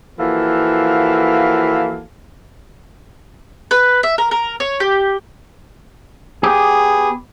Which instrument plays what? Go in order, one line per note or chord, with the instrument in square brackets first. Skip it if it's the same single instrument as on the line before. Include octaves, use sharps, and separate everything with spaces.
[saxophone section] E3 F3 A#3 F#4 A4 F5
[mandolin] B4
E5
A#4
A#4
C#5
G4
[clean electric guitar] B3 G4 [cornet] G#4